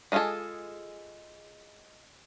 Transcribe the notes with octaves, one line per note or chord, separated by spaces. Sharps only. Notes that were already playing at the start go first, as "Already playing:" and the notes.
G#3 B3 F4 G#4 A4